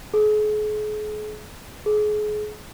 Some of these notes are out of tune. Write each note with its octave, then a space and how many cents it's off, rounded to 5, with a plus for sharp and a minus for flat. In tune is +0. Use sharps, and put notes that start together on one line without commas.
G#4 +40
G#4 +30